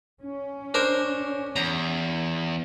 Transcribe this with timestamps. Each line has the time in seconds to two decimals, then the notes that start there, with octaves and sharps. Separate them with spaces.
0.21 C#4
0.74 D4 A#4 C5
1.56 E2 A#5